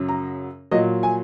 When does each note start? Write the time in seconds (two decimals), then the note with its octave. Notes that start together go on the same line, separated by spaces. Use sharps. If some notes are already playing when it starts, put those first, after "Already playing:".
Already playing: F#2 C#3 F#3
0.08 A#5
0.71 A#2 F#3 D#5
1.03 G#5